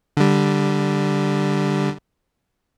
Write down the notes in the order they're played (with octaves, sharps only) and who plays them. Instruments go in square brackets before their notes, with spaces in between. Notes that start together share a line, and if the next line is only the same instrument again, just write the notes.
[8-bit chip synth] D3 G3